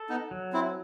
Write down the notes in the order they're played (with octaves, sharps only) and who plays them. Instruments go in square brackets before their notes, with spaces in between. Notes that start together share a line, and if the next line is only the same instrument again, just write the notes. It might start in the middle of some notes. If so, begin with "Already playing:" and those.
Already playing: [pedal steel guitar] A4
[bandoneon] B3 D#4
[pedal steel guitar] F#3
[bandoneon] C4 E4